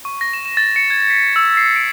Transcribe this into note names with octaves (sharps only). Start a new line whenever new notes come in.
C#6
A#6
E7
E7
A6
C#7
G#6
B6
E6
C7
D7